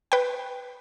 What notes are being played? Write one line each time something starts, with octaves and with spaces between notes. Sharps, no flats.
B4 G5